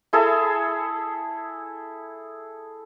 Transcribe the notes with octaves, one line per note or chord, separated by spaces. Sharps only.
E4 G#4 A4 E5